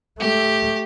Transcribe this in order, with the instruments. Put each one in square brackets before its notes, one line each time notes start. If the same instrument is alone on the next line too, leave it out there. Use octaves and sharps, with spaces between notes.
[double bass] A3 [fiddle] G4